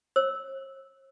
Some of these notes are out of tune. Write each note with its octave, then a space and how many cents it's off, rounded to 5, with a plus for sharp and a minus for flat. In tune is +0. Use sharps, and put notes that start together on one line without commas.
C5 +45 E6 -10